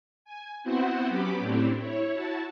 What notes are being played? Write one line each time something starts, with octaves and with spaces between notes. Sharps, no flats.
G#5
B3 C4 E4 F#4 C5 F#5
F#3 B3 C#4 G4 B5 D6
A2 A3 C4 D4 E4 G4
E4 C#5
E4 F#4 A5